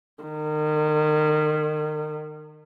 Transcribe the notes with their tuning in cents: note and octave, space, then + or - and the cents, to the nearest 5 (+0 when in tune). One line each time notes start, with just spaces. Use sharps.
D#3 -35